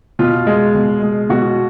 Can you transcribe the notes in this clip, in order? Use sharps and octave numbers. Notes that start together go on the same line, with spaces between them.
B2 F4
G#3
B2
G#3
B2 F#4